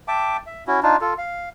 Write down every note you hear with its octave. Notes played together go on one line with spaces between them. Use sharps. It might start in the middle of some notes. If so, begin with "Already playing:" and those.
E5 G5 A5 D6
E5
C#4 E4 F#4
D4 D#4 F4
F4 A4
F5